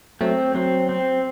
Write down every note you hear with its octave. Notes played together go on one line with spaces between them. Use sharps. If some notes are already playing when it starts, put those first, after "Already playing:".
F#3 A3 C4
F#3 C4
C4